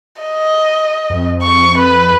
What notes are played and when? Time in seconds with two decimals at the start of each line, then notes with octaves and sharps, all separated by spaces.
0.22 D#5
1.10 F2
1.42 C#6
1.78 B4